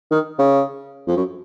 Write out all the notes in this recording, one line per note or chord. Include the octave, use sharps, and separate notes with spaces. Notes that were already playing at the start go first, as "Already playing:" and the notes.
D#3
C#3
F2
F#2